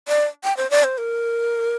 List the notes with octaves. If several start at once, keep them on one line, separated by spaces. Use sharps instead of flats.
D5
G5
C5
D5
C5
A#4